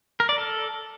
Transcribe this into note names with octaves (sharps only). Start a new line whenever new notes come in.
A#4
D5
A4